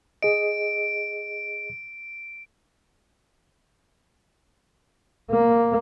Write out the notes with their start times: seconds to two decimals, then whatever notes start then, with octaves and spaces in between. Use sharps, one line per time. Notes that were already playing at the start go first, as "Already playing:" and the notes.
0.23 G#4 D#5 D7
5.31 A#3